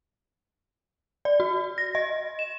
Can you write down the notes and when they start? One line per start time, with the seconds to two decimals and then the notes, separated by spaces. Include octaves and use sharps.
1.25 D5
1.40 F#4
1.78 A#6
1.95 D#5
2.39 E7